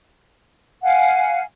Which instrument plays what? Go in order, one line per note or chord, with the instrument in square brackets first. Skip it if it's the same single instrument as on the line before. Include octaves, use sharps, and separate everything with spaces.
[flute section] F5 F#5 G#5